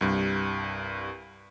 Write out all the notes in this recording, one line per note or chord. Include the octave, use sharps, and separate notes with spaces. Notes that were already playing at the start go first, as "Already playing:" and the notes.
C2 G2